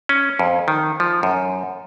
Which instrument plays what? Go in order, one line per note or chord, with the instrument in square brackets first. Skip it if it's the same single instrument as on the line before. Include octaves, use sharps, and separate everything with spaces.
[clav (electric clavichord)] C#4
F2
D#3
F3
F#2